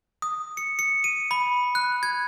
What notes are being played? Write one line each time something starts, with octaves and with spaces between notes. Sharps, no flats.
D#6
C#7
C#7
D#7
B5
F#6
G#6